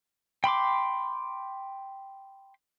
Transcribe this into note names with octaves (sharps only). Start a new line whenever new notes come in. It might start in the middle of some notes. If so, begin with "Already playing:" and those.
G5 B5 C6 D6